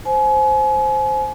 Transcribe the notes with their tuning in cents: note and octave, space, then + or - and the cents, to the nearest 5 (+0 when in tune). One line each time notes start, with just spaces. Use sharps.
C5 +0 G#5 +35